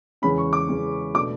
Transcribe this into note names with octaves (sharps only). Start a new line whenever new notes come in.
E2 C#3 G#3 C#4 B5
C#6
D6
E2 C#3 G#3 C#4
B2 A3 D4 D6